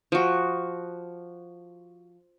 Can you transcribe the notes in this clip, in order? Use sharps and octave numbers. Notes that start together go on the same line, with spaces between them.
F3 F#4